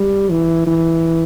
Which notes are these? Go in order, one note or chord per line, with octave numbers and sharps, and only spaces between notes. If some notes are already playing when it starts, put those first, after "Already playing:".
Already playing: G3
E3
E3